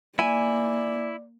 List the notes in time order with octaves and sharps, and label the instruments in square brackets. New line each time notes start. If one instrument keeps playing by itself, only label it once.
[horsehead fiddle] A#3 [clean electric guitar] E4 [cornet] D5 [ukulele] G#5